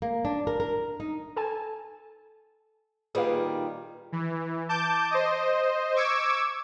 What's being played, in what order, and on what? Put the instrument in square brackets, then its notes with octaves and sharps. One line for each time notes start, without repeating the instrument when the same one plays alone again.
[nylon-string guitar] A#3
D4
A#4
A#4
D#4
[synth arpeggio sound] A4 G#5 A5
[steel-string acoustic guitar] A#2 D#3 G3 [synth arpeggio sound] G#4 B4 F5
[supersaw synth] E3
A5 D6 G6
C5 D#5
C#6 D6 E6 G#6